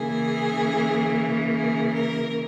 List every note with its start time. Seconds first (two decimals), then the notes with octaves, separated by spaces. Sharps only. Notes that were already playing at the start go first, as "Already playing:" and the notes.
Already playing: C#3 E3 A#3 G#4
1.53 G#4
1.94 A#4